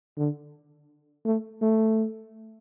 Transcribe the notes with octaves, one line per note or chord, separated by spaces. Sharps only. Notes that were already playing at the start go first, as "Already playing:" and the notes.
D3
A3
A3